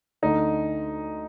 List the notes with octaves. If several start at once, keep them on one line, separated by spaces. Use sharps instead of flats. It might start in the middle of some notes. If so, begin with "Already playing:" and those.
D2 D3 D#4